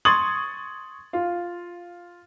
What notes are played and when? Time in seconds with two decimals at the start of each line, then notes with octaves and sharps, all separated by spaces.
0.05 C6 C#6 D#6 G#6 A6 F#7
1.13 F4